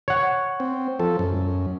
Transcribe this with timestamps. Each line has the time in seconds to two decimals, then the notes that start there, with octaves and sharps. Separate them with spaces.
0.08 C#5 F#5
0.60 C4
0.99 F3 A4
1.19 F#2